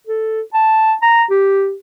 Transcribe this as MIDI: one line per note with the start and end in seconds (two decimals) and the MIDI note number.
0.07 0.42 69
0.54 0.94 81
1.02 1.24 82
1.30 1.74 67